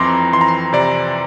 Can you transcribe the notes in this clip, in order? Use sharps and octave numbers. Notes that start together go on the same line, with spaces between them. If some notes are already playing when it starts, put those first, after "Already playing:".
Already playing: F2 E3 C4 A#5 C6 D6
E3 C6
A#5
C6
C3 D5